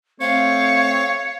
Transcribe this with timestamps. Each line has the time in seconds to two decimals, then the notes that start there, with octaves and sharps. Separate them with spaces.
0.21 A3 C4 C#5 F5 C#7